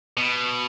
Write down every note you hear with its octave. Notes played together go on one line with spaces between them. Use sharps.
B2